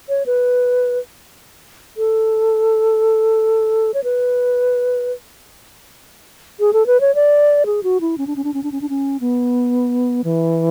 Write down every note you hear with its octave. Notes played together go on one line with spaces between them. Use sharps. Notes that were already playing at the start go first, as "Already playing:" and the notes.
C#5
B4
A4
C#5
B4
G#4
A4
B4
C#5
D5
G#4
F#4
E4
C#4
D4
C#4
D4
C#4
D4
C#4
D4
C#4
B3
E3